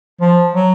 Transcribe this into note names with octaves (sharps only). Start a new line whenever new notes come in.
F3
F#3